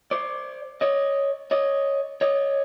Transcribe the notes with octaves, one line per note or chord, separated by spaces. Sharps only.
C5 D5
C#5 D#5
C#5 D#5
C#5 D#5